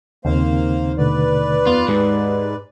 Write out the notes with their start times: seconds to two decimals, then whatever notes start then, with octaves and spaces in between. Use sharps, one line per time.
0.25 D#2 C#3 A#3 C4 C5 F5
0.98 B2 D3 A3 B4 D5
1.67 F2 B3 F4
1.88 G#2 G4